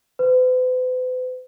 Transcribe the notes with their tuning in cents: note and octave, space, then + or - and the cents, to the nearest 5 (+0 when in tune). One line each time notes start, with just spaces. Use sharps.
B4 +45